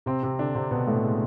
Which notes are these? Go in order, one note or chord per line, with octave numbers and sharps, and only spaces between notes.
C3 C4
C3 C4
D3 D4
C3 C4
B2 B3
A2 A3
G#3